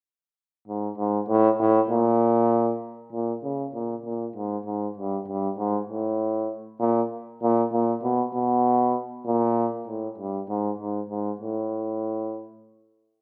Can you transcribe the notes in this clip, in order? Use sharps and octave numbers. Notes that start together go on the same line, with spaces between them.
G#2
G#2
A2
A2
A#2
A#2
C#3
A#2
A#2
G#2
G#2
G2
G2
G#2
A2
A#2
A#2
A#2
B2
B2
A#2
A2
G2
G#2
G#2
G#2
A2